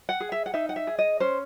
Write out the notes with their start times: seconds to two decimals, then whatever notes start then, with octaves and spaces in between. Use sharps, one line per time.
0.09 F#5
0.20 G#4
0.32 E5
0.46 F#5
0.54 D#4 E5
0.69 F#5
0.76 E5
0.87 G#4
0.99 D#5
1.20 C#4 C5